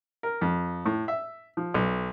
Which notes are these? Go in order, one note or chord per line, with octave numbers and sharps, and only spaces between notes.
A#4
F2
A2
E5
F3
B1